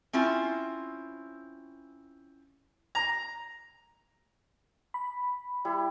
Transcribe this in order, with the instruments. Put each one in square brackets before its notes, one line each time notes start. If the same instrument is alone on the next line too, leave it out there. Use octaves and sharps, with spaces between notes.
[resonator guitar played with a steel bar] C4 C#4 E4 F4
[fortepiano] A#5
[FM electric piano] B5
[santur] G3 E4